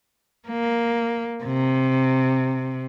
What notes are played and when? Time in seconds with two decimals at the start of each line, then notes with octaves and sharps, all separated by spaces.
0.48 A#3
1.44 C3